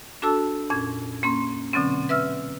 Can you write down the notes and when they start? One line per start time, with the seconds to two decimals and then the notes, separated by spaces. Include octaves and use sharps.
0.22 D4 F#4 A4 A5 E6
0.70 F2 A#2 C#4 G#6
1.23 A#3 C#4 C6
1.73 B2 D3 F#3 C4 C#4
2.09 B4 E5 E6 F6